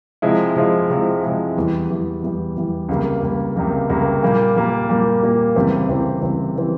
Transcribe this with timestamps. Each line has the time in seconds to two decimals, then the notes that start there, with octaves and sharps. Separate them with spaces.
0.22 C3 F3 G#3 E4
0.56 C3 F3 G#3 E4
0.90 C3 F3 G#3 E4
1.22 C3 F3 G#3 E4
1.56 E2 E3 G3
1.89 E2 E3 G3
2.23 E2 E3 G3
2.56 E2 E3 G3
2.89 C#2 C3 G3 A#3
3.22 C#2 C3 G3 A#3
3.56 C#2 C3 G3 A#3
3.90 C#2 C3 G3 A#3
4.22 A#2 G3 A#3
4.55 A#2 G3 A#3
4.89 A#2 G3 A#3
5.22 A#2 G3 A#3
5.55 C#2 C3 E3 G3 C4
5.88 C#2 C3 E3 G3 C4
6.22 C#2 C3 E3 G3 C4
6.56 C3 E3 G3 C4